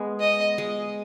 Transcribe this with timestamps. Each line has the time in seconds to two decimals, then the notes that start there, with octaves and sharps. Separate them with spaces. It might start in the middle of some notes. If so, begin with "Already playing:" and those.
Already playing: G#3 B3
0.20 D#5
0.58 G#3